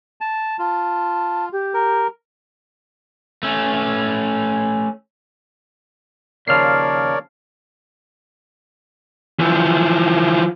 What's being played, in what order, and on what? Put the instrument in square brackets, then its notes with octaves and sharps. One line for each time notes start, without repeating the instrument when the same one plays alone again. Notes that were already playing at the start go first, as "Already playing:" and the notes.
[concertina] A5
[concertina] F4 [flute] A5
[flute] G4
[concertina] A#4
[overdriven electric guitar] A3 C#4
[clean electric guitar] D#2 C#3 F3 [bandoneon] A#4 C#5 D5 [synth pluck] F6 C7
[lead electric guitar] E3 F3